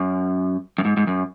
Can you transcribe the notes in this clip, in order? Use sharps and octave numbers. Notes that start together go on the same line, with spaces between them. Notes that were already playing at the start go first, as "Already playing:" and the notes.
Already playing: F#2
F#2
G#2
G#2
F#2